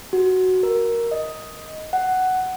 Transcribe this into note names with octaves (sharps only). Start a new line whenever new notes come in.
F#4
A#4
D#5
F#5